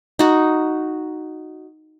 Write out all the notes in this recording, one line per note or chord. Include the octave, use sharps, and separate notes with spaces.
D#4 F#4